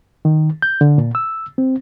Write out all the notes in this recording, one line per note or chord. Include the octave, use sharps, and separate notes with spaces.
D#3
G6
D3
A#2
E6
C4